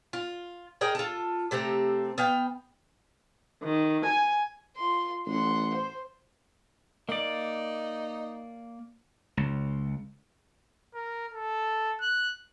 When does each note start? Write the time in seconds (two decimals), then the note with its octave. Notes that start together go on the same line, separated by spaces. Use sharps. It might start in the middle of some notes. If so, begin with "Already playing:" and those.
0.13 F4
0.81 G#4 A#4 D#5 G5
0.95 F4 A4
1.51 C3 A3 C4 A#5
2.18 B3 F5 G5
3.63 D#3
4.05 G#5
4.77 F4 C6
5.26 A1 F#5 C6
5.74 C5
7.09 A#3 D#4 D5
9.37 C#2
10.94 A#4
11.34 A4
12.01 F#6